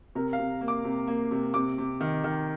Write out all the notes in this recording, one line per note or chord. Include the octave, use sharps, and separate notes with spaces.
C3 A#4
F5
C3
A#3
D6
C3
A#3
C3
C3 D6
C3
D#3
D#3